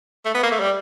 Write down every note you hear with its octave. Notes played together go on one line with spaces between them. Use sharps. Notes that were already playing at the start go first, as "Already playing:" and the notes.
A3
B3
A#3
A3
G3